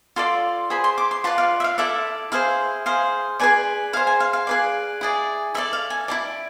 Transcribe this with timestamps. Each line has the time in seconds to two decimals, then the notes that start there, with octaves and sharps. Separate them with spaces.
0.16 F4 A4 D5 C6
0.70 G#4 C5 B5
0.84 C6
0.98 D6
1.11 C6
1.24 F4 B4 D5 A5
1.38 F5
1.60 E5
1.64 F5
1.78 E4 A4 D5 E5
2.32 E4 G#4 C5 F5
2.86 G#4 C5 F5
3.40 G#4 B4 D5 G#5
3.93 G#4 F5
3.97 C5
4.07 G#5
4.20 F5
4.33 F5
4.47 G#4 B4 D5
5.01 E4 G#4 D5
5.54 E4 A4 D5 E5
5.73 F5
5.90 G#5
6.08 E4 G#4 D5 A5